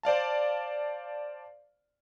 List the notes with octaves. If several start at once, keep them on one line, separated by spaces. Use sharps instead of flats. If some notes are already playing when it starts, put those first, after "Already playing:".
C5 D5 F5 A5